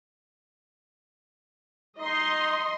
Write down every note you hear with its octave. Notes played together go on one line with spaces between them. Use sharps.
D#4 D#5 C6